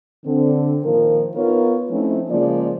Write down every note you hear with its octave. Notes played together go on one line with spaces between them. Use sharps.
D3 C4
A#2 D#3 F3 A#4
B3 D#4 F4 A#4 B4 C#5
F3 A3 C4 C#4 D#4 E4
C#3 F3 G#3 A#3 D5